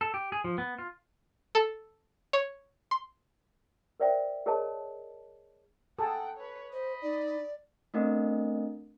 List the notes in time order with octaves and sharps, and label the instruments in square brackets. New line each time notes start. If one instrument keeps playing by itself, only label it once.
[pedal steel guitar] A4
G4
G#4
F3
B3
F4
[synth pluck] A4
C#5
C6
[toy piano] A#4 C5 D5 E5 G5
G#4 A#4 C#5 D#5 A5
[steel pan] G#4 A4 [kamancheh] F#5 G5
[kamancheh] B4 C#5
[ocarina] C5 [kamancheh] D#5 B5
[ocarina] D#4 [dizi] D5
[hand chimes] A3 B3 C4 D4 A#4 D#5